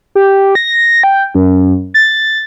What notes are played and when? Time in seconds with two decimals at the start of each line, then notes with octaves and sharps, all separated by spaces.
0.15 G4
0.55 A#6
1.03 G5
1.35 F#2
1.94 A6